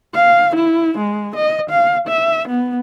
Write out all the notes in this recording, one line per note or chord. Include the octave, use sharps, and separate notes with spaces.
F5
E4
G#3
D#5
F5
E5
B3